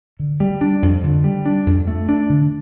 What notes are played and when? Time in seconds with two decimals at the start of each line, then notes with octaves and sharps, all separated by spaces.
0.19 D3
0.40 G3
0.61 D4
0.82 F2
1.03 D3
1.24 G3
1.46 D4
1.66 F2
1.87 A3
2.09 D4
2.29 D3